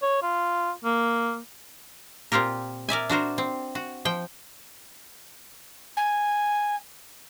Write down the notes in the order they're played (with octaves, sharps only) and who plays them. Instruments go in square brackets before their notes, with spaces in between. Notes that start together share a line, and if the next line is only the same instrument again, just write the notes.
[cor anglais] C#5
F4
A#3
[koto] A#2 C4 F4 G4 A#4
A#4 D5 E5 G#5
D4 F#4 A#4 C5
C4
F#4
F3 G5
[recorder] G#5